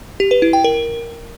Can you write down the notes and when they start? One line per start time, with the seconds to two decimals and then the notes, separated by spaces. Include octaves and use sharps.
0.20 G4
0.31 B4
0.42 E4
0.53 G5
0.64 A#4